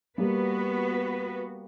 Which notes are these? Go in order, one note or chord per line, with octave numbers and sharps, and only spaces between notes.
G3 A#3 B3 F#4 B4